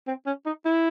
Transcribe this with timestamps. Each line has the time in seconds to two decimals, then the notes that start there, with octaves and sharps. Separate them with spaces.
0.07 C4
0.26 C#4
0.46 D#4
0.65 E4